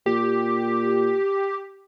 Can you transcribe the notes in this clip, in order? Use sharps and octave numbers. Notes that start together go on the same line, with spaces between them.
A#2 G4